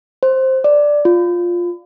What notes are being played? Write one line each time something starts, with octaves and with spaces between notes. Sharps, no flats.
C5
D5
F4